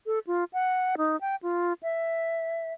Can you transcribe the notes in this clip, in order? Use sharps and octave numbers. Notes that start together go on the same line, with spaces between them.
A4
F4
F#5
D#4
G5
F4
E5